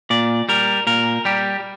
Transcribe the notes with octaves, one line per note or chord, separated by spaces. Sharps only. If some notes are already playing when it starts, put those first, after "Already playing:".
A#2 D5
G3 A#4
A#2 A#4
G3 G4